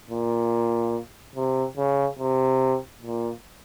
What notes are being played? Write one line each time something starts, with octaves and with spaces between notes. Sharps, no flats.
A#2
C3
C#3
C3
A#2